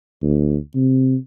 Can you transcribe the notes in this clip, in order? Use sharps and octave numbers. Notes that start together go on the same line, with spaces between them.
D2
C3